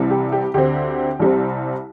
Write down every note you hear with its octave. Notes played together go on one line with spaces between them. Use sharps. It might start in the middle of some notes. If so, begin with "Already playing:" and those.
Already playing: C2 C3 E3 G3
G4
G4
D2 D3 C4 G4
C2 C3 G3 C4